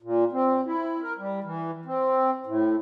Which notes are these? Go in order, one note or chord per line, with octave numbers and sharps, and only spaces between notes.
A#2
C4
E4
A#4
G3
E3
C4
A2